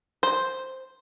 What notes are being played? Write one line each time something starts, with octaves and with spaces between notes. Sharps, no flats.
C5